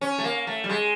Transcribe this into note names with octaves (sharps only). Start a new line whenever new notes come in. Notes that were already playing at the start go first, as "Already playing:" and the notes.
C#4
A3
A#3
A3
G3
G#3